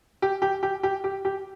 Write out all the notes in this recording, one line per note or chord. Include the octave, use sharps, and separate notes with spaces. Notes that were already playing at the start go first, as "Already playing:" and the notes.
G4
G4
G4
G4
G4
G4